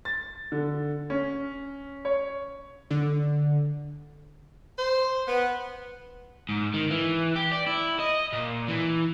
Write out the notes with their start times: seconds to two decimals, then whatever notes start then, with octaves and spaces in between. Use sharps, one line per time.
0.05 A6
0.52 D3
1.10 C#4
2.05 C#5
2.91 D3
4.79 C5
5.28 B3
6.49 G#2
6.74 D#3
6.91 E3
7.36 G4
7.51 D5
7.67 E4
8.00 D#5
8.33 A#2
8.68 E3